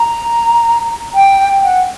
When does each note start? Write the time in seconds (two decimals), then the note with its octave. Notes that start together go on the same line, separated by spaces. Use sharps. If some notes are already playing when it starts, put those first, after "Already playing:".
Already playing: A#5
1.15 G5
1.64 F#5